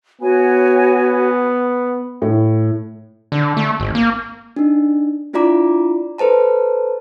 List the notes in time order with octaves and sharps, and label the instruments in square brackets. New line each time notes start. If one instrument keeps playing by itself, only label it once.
[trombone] B3 [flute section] F#4 C#5 G#5
[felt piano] A2
[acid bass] D3
A3
G#1
A#3
[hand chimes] D4 D#4
D4 E4 F4 D5 A#5 D6
A4 B4 C5 A5 A#5